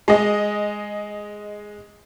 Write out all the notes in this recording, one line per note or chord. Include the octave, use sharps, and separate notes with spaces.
G#3 D#5